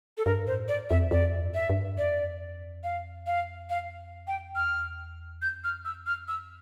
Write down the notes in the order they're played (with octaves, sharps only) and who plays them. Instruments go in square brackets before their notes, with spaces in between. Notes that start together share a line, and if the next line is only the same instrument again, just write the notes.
[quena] A4
[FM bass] G2 [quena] A#4
[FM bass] A2 [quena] C5
[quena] D5
[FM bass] F2 [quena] E5
[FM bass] F2 [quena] D5
[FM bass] G2
[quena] E5
[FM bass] G2
[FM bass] F2 [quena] D5
[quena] F5
F5
F5
G5
[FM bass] E2 [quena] F6
[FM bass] F2 [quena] G6
[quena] F6
E6
F6
E6